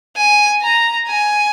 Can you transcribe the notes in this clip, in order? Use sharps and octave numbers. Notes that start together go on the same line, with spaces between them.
G#5
A#5
G#5